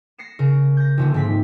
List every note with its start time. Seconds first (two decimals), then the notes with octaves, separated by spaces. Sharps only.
0.18 A#6 C7 C#7 E7
0.39 C#3 A#4
0.77 G6 A#6
0.97 D#1 A#1 D3
1.14 G#2 C4 B6